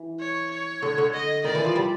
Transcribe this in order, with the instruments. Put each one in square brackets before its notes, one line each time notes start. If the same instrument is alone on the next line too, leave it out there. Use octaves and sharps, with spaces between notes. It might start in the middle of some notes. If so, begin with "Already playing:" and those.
Already playing: [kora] E3
[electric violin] C#5
C#5
[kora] D3
D3
[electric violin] D#5
[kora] D#3 [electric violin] D5
[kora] E3
F3
G3